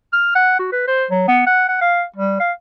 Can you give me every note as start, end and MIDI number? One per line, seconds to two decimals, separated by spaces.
0.13 0.34 89
0.35 0.57 78
0.59 0.68 66
0.72 0.83 71
0.88 1.05 72
1.10 1.24 54
1.28 1.44 59
1.47 1.68 78
1.69 1.81 78
1.81 2.04 77
2.16 2.39 55
2.40 2.52 77